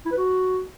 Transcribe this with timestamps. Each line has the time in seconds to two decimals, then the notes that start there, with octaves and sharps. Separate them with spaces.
0.05 E4
0.11 B4
0.17 F#4